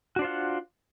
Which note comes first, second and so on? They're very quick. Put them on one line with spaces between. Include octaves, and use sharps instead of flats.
F#4 D4 C5 F4 F#5